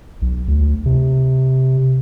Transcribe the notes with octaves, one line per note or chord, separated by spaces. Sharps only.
B1
D2
C3